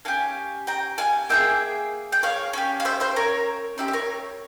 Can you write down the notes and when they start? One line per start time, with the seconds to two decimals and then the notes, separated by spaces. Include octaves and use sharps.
0.05 C#4 G4 F5 G#5
0.67 G5 A#5
0.98 F5 G#5
1.29 A#3 E4 G#4 E5 G5
2.12 G5
2.23 C#5 F5
2.53 C#4 G4
2.80 F5
2.85 C5 E5
3.00 C5 E5
3.16 A#4 C#5
3.78 C#4 G4 C5 E5
3.88 E5
3.93 A#4 C#5